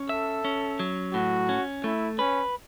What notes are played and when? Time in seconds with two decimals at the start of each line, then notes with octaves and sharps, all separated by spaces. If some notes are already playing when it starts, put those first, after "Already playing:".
Already playing: C#4
0.09 A4 E5
0.45 C#4
0.80 F#3
1.14 A2 F#4
1.49 C#4
1.84 A3 E4
2.19 C#4 B4